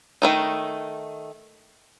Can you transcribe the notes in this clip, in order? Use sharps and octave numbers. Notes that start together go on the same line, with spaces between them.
D#3 A3 D#4